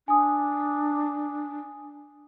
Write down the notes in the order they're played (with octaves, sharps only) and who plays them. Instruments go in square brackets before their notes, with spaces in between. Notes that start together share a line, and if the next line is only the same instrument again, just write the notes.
[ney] D4 [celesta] G#5 D#6